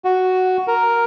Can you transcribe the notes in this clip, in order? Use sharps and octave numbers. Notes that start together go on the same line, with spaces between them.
F#4
A#4